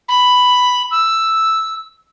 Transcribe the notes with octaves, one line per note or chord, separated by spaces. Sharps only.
B5
E6